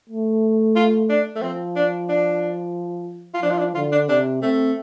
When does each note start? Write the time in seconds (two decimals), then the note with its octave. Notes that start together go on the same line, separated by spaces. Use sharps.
0.09 A3
0.76 F4
1.10 D4
1.36 A3
1.42 F3 C4
1.76 D4
2.09 D4
3.34 F4
3.42 F3 D4
3.51 F4
3.59 D4
3.75 D3 F4
3.92 D4
4.09 C3 D4
4.42 A3 C4